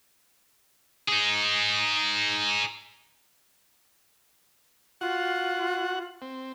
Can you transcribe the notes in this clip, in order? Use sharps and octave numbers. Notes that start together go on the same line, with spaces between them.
D#4 G#4
F4 F#4 F#5
C4